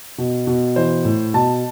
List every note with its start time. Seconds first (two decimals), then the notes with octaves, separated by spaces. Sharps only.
0.18 B2
0.47 B2
0.76 E3 C5
1.05 A2
1.34 B2 A5